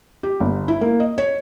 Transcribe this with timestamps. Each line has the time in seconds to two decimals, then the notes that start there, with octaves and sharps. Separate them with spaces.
0.23 G4
0.40 G1
0.68 E4
0.81 A#3
1.00 D#5
1.18 C#5